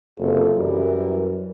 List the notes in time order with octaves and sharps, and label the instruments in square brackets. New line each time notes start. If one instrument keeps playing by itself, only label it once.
[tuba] F#1 [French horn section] C3 F4 A4
[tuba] F#2 [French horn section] E3 G3 A#4